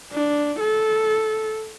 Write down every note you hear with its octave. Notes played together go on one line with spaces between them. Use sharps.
D4
A4